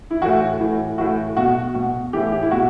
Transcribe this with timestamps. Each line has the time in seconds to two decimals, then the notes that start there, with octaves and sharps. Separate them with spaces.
0.11 E4
0.22 A2 E3 F#4
0.60 A2 E3
0.98 A2 E3 F#4
1.37 B2 F#4
1.74 B2 F#4
2.13 E3 G4
2.16 A2
2.32 G4
2.43 E4
2.51 B2 F#4